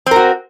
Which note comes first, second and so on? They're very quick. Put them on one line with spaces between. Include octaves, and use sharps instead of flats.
C4 A#4 F#4